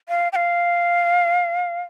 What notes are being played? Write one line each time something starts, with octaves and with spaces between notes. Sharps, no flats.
F5
G5
F5